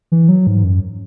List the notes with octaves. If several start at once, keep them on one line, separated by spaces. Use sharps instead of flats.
E3
F#3
G#2
F#2